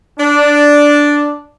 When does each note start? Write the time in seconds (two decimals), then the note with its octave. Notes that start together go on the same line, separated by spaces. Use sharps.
0.19 D4